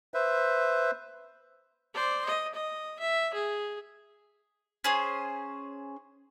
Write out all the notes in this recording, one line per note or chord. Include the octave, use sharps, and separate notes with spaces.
B4 C5 E5
C5 D5
D#5
D#5
E5
G#4
C#4 G#4 C5